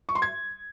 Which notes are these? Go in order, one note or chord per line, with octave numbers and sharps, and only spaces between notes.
C#6
C6
G#6